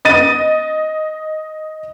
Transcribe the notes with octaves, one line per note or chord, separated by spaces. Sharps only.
D#5 A6 D#7